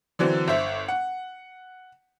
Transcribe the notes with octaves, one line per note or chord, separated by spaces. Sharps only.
D3 E3 F#3 C4
G1 C5 E5
F#5